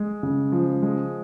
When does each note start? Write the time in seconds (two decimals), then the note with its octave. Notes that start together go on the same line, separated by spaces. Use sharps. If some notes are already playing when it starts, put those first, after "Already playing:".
Already playing: G#3
0.23 C#3
0.52 F3
0.82 G#3